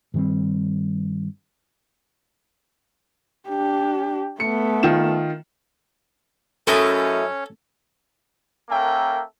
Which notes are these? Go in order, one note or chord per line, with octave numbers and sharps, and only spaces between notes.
G2 D#3 G3 C4
D4 G4
A3 B3 C#7
D#3 F4 E7
F#2 A3 C#4 E4 A4 C#5 D#5
A#3 C#4 A4 A#4 E5 G5